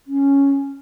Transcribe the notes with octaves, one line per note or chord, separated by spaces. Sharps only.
C#4